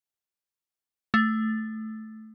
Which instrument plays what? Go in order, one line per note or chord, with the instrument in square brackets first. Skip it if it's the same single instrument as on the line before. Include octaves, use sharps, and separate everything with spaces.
[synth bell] A3